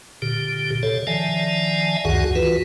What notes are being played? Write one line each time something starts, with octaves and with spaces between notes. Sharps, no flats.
A#2 D3 G4
C3 A4 C#5
D#3 F3 D5 E5 G#5 A5
C#2 F#2 D#3 F#4 G#4 F#5
E3 F4 F#4 B4